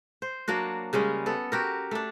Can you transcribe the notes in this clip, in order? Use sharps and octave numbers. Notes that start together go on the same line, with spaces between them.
C5
F#3 A#3 D4 F#4
C#3 G3 G#3 C#4
B3 A4
F#4 G4 A#4
A3 D4